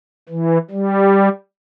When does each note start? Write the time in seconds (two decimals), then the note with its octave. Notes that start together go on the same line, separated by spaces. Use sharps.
0.29 E3
0.71 G3